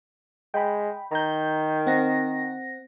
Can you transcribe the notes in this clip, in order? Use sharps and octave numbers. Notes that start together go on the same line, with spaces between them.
G#3 G5 B5
D#3 A#5 G6
C4 F#5 A#6